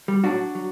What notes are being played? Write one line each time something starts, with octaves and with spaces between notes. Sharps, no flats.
G3
A2 F#3 D4 F#4
F#3